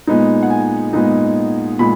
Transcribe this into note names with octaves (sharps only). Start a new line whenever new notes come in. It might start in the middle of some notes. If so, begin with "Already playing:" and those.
A#2 G#3 B3 D#4
F#5
G#5
A#2 G#3 B3 D#4
A#2 G#3 B5